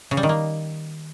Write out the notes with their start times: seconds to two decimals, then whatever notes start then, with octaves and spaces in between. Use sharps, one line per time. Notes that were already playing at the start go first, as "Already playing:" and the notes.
0.11 C#3
0.17 G3
0.23 D#3
0.29 A#3